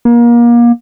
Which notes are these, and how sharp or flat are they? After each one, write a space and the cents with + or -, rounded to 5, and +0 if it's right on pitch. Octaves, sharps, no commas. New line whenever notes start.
A#3 +30